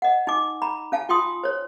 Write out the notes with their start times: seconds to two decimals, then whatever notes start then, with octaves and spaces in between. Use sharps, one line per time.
0.02 D#5 F#5
0.27 D#4 G#5 D6
0.62 A#5 B5
0.92 C#4 F5 G#5 A5
1.09 F4 G5 C6 D#6
1.44 C5 C#5